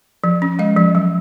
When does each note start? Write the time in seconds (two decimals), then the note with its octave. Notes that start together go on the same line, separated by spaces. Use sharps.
0.24 F3
0.42 C#4
0.59 G#3 D#5
0.77 F3
0.95 F#3